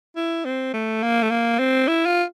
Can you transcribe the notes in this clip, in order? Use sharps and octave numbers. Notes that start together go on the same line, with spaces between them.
E4
C4
A3
A#3
A3
A#3
C4
E4
F4